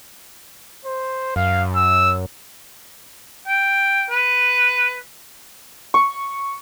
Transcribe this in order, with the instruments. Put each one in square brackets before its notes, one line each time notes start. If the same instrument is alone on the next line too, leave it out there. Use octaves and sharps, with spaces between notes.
[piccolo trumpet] C5
[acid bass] F#2 [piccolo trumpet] F5
[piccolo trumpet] E6
[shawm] G5
B4
[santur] C#6